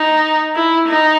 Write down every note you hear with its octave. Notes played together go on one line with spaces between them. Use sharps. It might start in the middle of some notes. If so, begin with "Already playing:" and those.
Already playing: D#4
E4
D#4